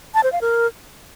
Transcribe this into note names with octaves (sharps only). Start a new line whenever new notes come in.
A5
C5
F5
A#4